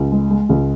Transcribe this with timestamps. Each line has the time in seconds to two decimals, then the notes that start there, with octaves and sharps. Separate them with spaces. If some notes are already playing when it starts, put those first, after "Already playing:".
Already playing: C#2
0.12 G#3
0.31 G#3
0.49 C#2